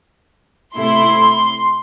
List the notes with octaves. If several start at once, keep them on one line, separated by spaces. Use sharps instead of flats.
C3 A3 E4 C6